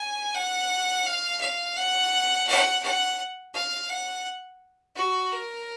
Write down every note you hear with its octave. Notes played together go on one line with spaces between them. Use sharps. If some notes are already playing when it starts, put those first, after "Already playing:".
Already playing: G#5
F#5
F5
F5
F#5
F#5
F#5
F5
F#5
F#4
A#4